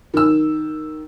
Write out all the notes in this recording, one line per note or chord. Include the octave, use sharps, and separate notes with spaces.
D#3 E6